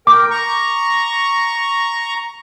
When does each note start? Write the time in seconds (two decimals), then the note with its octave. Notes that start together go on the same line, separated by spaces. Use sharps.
0.07 A#4 G5 D6
0.31 A#5 C#6